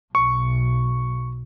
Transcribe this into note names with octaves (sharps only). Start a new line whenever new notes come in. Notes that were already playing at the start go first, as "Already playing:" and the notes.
B1 C#6